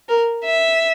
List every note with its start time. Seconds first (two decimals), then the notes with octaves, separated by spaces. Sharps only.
0.09 A#4
0.44 E5